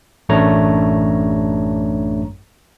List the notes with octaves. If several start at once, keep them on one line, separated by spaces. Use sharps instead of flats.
A1 F#2 A3 D4 C#5 A#5